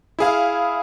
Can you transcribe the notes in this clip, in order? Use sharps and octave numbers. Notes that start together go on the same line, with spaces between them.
E4 G#4 F5